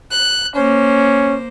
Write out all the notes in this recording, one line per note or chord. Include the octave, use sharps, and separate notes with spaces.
F#6
A#3 C#4 C5